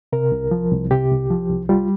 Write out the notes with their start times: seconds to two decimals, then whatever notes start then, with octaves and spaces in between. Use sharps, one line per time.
0.13 C3 A#4
0.32 C2
0.51 F3
0.71 C2
0.91 C3 G4
1.11 C2
1.30 F3
1.50 C2
1.69 G3 F4